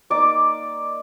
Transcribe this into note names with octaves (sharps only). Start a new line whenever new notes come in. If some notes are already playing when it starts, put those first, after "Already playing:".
A#3 D#4 D5 D6